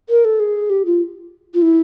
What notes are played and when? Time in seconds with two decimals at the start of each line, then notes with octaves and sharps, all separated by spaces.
0.09 A#4
0.25 A4
0.40 G#4
0.70 G4
0.86 F4
1.54 F4
1.62 E4